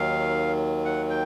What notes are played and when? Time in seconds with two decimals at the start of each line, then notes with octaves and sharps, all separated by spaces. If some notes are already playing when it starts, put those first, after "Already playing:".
Already playing: D#2 D#3 F#3 F5
0.85 F#5
1.10 G5